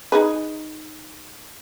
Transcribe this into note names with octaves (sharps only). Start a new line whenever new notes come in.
D#4 G#4 B4